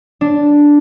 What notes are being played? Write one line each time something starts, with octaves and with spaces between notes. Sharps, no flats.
D4